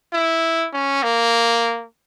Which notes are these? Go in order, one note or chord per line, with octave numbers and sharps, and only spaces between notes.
E4
C#4
A#3